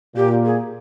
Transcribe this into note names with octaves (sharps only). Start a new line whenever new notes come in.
A#2 G4
G#4